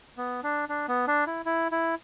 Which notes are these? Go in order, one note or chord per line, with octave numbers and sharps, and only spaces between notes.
B3
D4
D4
B3
D4
E4
E4
E4